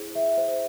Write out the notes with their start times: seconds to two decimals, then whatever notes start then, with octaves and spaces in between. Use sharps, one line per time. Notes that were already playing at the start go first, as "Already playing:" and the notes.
Already playing: E4 G#4 C5
0.15 E5
0.37 C5